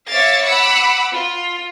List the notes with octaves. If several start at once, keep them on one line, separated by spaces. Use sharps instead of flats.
C#5 E5 F5 D6 A6
F#5 B5 D6 E6
F4